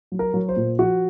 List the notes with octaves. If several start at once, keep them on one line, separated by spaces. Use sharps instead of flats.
F#3
A#4
F#3
C5
A#2
F3 F#4